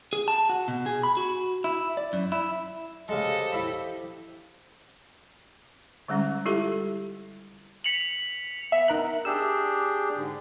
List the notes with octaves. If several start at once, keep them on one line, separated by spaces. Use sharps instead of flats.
G#4
A5
F#4
B2
G#4
B5
F#4
E4
D5
F#2
E4
C#3 G#3 G4 A4 C5 D#5 F5
E4 E5 B5
D3 G3 G#3 C#4
G3 E4 F4 G4 A4
B6 C#7 F7 F#7
B3 E5
D#4 A#4 F#6
D4 G4 G#4 E6
G#2 D3